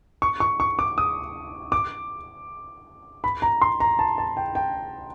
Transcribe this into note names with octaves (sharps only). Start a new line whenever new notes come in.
C#6
C#6
C#6
D6
D#6
D6
B5
A#5
C6
A#5
A5
A5
G5
G5